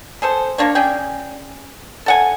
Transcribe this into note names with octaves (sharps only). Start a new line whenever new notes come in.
G#4 A4 C5
A#3 D4 C#5
C#4 G#4 D5 G5
A4 F#5 G#5